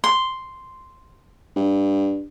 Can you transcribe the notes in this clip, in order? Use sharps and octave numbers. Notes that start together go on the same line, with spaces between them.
C6
G2